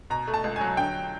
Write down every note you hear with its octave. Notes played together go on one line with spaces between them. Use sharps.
B2 A#5
A3
A5
C#2
F#3 G#5
D3 G5